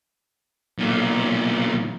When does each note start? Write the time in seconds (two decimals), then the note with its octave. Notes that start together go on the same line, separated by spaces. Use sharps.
0.79 B1 A#2